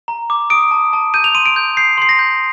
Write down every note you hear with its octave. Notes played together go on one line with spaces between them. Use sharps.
A#5
D6
D#6 D7
A5
A5
G6 D#7
F7
C6 D#7
D7
G6
G6 C7
C6 C7
A#6
G6